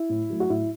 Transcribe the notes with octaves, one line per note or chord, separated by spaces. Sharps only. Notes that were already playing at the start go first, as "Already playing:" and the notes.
Already playing: E4
A2
F#3 A3
F#4
A2 E4